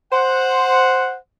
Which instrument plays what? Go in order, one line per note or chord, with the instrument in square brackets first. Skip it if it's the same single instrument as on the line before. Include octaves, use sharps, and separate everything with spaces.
[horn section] C5 F#5